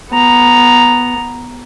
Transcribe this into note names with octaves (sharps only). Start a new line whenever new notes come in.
B3 A#5